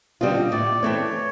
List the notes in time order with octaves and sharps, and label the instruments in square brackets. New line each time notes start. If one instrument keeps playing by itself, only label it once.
[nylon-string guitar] D3 G3 C4 F4 [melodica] D#5
[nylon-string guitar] A2 [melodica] D5
[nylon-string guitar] E3 A3 C4 [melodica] C#5